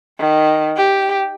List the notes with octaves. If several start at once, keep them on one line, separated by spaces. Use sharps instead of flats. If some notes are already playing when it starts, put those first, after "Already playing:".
D#3
G4